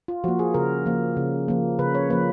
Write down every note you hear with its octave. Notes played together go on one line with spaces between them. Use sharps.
F4
F3 A#3 F#4
G#4
C#3 A#4
F3 A#3
C#3
F3 A#3
C#3 B4
C#5
F3 A#3 B4